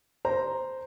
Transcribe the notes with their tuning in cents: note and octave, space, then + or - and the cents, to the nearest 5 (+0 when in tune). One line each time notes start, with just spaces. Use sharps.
C5 -5 A#5 +0